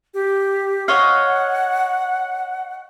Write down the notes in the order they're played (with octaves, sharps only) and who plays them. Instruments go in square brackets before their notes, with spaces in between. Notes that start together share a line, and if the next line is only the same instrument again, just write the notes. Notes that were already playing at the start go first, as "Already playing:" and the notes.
[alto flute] G4
[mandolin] C#5 D#5 F5 [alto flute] F#5